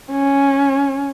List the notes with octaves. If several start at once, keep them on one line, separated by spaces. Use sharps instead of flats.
C#4